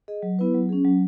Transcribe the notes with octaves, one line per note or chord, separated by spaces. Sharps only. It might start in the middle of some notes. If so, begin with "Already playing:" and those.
G#4 D#5
F#3
B3 E4 B4
F#3
C#4 G#4
F#3